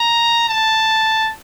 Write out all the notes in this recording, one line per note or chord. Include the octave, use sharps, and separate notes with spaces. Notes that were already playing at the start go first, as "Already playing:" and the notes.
Already playing: A#5
A5